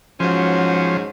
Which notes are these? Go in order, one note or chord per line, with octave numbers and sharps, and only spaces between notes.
G#2 F3 F#3 C#4 C5